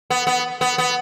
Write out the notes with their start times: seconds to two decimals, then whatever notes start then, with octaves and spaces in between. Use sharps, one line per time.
0.10 B3
0.27 B3
0.61 B3
0.78 B3